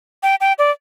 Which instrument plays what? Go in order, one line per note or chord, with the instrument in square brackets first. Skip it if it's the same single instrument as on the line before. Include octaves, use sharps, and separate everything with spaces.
[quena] G5
G5
D5